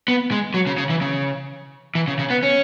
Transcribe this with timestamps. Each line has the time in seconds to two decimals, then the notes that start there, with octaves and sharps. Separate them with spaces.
0.08 B3
0.31 G#3
0.54 F#3
0.67 C#3
0.78 C#3
0.90 E3
1.01 C#3
1.95 E3
2.08 C#3
2.19 C#3
2.30 B3
2.43 C#4